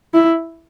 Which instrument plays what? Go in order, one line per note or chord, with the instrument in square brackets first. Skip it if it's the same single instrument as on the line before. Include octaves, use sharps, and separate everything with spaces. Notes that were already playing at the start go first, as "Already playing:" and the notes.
[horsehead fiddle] E4